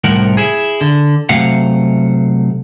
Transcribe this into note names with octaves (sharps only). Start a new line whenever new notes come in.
C2 A2 F3 A#4 F#5
E4 G#4
D3
C3 F#3 A3 F5 F#5